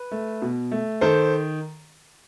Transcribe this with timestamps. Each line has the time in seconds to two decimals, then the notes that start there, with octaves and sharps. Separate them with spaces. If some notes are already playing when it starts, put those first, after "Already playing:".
Already playing: B4
0.11 A3
0.42 B2
0.71 A3
1.01 D#3 A4 C5